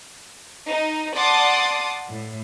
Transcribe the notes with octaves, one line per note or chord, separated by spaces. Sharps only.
D#4
D5 F#5 A5 C6 D6 D#6
A2